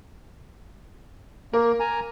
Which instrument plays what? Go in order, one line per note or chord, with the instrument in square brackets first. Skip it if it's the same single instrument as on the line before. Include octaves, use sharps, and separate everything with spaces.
[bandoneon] A#3 [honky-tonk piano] A#4
[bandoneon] G#5 A#5